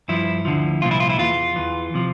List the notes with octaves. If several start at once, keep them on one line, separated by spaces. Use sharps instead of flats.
G2 F3 E4
D2 D3 F3
C2 A#2 F3 F4
E4
F4
E4
E2 E3 F4
E2 E3
C3 F3